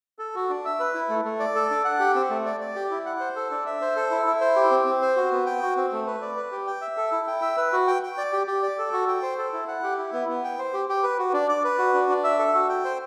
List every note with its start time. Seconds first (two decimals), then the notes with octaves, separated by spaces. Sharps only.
0.19 A4
0.35 F#4
0.49 D4
0.65 E5
0.80 B4
0.94 E4
1.09 A3
1.25 A3
1.40 D5
1.55 A4
1.70 D4
1.85 F#5
2.00 G4
2.15 C4
2.30 A3
2.46 D5
2.60 D5
2.75 G4
2.91 E4
3.06 F#5
3.20 C5
3.36 A4
3.51 D4
3.66 E5
3.81 C5
3.96 A4
4.11 E4
4.26 E4
4.41 C5
4.56 G4
4.71 C4
4.86 C4
5.02 C5
5.16 F#4
5.32 B3
5.46 G5
5.62 F#4
5.76 C4
5.92 A3
6.07 B4
6.22 D5
6.37 B4
6.52 G4
6.67 G5
6.81 E5
6.97 A4
7.12 E4
7.27 G5
7.42 E5
7.57 B4
7.72 F#4
7.88 G5
8.03 G5
8.18 D5
8.33 G4
8.47 G4
8.63 D5
8.78 A4
8.93 F#4
9.08 G5
9.22 C5
9.38 A4
9.53 E4
9.68 F#5
9.83 G4
9.99 E4
10.13 B3
10.28 B3
10.44 G5
10.59 C5
10.74 G4
10.89 G4
11.03 B4
11.18 F#4
11.33 D4
11.49 D5
11.64 B4
11.78 F#4
11.94 D4
12.09 D4
12.24 E5
12.39 A4
12.54 F#4
12.69 G5
12.84 C5